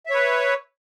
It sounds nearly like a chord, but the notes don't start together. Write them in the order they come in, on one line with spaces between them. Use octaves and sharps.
E5 C#5 B4